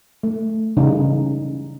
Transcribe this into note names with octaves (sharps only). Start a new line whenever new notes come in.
A3
C#3 E3 G3 D#4